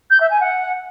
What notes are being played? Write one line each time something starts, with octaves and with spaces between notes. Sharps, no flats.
G6
E5
G#5
F#5